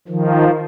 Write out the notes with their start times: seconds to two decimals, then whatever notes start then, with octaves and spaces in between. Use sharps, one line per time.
0.08 D#3 F3